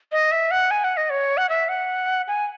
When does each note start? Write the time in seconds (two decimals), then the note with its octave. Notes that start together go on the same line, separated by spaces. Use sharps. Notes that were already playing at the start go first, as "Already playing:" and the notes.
0.12 D#5
0.32 E5
0.51 F#5
0.71 G#5
0.84 F#5
0.97 D#5
1.10 C#5
1.37 F#5
1.49 E5
1.69 F#5
2.28 G#5